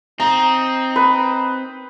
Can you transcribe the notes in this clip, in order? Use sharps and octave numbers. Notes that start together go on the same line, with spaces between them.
C4 D#4 A#5
B4